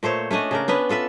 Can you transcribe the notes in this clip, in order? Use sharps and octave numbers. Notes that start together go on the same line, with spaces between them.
A#2 A3 C5 C#5
A3 C#4 D4 D#5
C#3 D4 A#4
B3 C#4 D4 B4
F4 A4 B4 E5